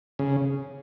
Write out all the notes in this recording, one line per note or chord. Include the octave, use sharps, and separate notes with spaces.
C#3